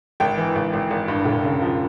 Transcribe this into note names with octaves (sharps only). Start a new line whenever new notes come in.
G#1 G5
E3
G#1
G#1
G#1
G2
E1
C#3
F3